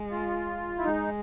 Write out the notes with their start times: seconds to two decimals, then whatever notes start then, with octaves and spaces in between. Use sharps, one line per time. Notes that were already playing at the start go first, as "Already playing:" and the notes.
Already playing: G#3
0.11 F4
0.78 E4
0.84 G#3 D#4